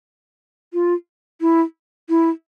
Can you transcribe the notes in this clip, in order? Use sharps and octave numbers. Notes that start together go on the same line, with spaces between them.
F4
E4
E4